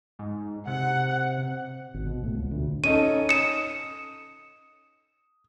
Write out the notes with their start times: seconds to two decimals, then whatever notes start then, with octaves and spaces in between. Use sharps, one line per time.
0.19 G#2
0.67 C3 F#5
1.94 G#1
2.06 B2
2.23 A2
2.35 C#2
2.51 D2
2.84 C#4 D#4 A4 D#7
3.29 D#6 C#7 E7